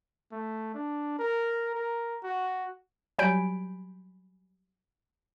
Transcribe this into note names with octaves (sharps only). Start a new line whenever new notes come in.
A3
D4
A#4
A#4
F#4
F#3 G3 G#5 B5 G6 D7